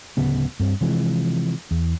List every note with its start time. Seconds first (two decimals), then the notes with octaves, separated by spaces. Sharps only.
0.17 D1 C#3 B3
0.60 G2 C4
0.81 C3 E3 F3 G#3
1.71 E2